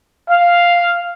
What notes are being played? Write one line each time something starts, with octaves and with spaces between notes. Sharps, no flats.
F5